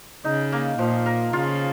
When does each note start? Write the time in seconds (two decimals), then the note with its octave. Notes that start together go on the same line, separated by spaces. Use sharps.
0.24 C#3 D#4
0.52 A#3
0.79 A#2 F3
1.06 A#4
1.33 C#3 F4